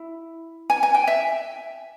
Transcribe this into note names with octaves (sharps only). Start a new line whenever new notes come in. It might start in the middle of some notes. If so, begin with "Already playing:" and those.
Already playing: E4
G#5
G#5
G5
E5